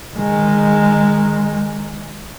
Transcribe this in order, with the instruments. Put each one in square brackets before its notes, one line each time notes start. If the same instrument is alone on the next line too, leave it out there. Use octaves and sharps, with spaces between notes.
[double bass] D#3 G#3